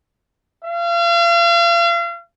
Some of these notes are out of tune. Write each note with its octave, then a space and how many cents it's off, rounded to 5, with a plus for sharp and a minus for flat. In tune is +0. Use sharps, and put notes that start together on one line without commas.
F5 -40